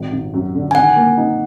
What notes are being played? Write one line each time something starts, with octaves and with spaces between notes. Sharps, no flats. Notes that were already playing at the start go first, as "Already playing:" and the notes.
Already playing: G#1 D#3
G#1
F#2
D3
G#5
D#3 F#5
A#3
D#4